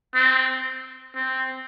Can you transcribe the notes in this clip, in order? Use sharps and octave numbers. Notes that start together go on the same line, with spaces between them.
C4
C4